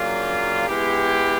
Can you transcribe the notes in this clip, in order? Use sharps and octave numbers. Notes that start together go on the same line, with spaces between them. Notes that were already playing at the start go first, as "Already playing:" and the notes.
Already playing: C#3 F#3 A#3 D4 F4
G#3 B3 E4 G4